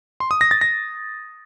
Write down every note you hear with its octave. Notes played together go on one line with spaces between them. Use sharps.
C6
D#6
A#6
A6
A#6